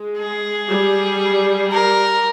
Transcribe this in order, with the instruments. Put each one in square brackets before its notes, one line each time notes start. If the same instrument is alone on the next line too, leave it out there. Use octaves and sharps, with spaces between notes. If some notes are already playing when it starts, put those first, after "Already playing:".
Already playing: [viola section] G#3
[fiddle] G#4
[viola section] G3
[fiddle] A#4